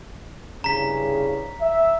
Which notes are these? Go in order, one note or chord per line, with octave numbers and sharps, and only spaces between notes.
C2 G2 C#3 A#5 B6
E5